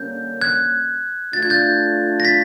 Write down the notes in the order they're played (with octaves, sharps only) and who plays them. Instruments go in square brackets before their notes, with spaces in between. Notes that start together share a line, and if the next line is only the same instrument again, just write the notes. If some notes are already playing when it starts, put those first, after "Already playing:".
Already playing: [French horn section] D3 G3 A#3 C#4 [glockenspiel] G6
[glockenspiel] F#6 G#6
[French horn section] A3 D4 F4 [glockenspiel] A6
[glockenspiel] G#6
G6 A6
A#6
A6 B6